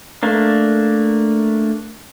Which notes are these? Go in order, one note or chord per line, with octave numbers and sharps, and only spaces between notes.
A3 A#3 D4